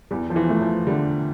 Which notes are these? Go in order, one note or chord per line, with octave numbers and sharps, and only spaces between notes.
E2 G3
F3
E3
A3
F3
D3 G3